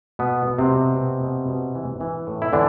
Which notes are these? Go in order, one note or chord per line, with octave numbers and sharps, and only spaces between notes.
B2 B3
B2
C3 C4
B2
B2
B2
B2
E3
E3
A2
E4
D3 E3 D4